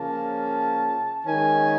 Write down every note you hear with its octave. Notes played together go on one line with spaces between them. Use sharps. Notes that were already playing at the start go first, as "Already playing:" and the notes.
Already playing: C#3 F3 A#3 C#4 A5
D#3 G#3 C#4 G#5